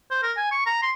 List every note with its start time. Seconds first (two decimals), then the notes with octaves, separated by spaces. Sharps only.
0.11 C5
0.23 A#4
0.37 G#5
0.52 C#6
0.66 A#5
0.82 C6